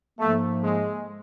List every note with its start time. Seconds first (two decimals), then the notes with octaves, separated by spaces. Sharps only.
0.19 G#2 F3 A3 A#3
0.63 G#3